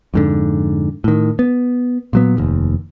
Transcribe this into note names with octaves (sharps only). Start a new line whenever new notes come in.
F2 G#2 D3
A2 D#3
B3
A#2 F#3 B3
F1 D#2